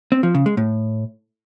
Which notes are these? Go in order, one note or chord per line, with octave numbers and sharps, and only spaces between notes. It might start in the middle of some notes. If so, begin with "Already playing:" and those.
C4
F3
C#3
G#3
A2